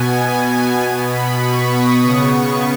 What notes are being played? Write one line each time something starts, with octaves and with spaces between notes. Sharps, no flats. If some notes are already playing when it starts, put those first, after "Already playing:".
Already playing: B2 B3 G#5
B2 B3 G#5
B5
C#6
D#6
C#3 B3 C#6